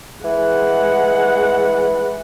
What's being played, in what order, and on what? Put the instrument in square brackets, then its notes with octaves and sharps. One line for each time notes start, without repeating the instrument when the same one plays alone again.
[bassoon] E3 [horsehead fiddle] G#3 F#5